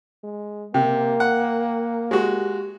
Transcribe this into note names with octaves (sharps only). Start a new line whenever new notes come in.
G#3
C3 A#3 A#4 G5
F#5
G#3 F#4 G4